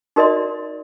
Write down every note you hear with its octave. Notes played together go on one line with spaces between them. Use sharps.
D#4 F#4 A#4 D5 D#5 C6